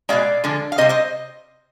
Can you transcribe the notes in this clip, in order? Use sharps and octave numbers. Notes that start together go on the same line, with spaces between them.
B2 G#3 D5 F5
D3 F3 G#3
F5
C3 G3 C5 D#5
C5 D#5